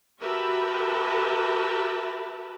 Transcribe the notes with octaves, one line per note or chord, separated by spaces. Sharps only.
F#4 G4 A#4 B4 E5 A5